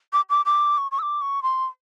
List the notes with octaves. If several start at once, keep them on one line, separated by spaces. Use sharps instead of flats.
D6
D6
D6
C#6
C#6
E6
D6
C#6
C6